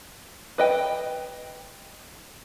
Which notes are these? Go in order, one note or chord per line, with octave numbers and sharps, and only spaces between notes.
B4 D#5 G5